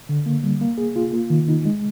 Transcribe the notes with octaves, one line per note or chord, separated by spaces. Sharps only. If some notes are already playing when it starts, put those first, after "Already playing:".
D3
A#3
G3
A#3
G#4
F4
A#3
D#3
D#4
G#3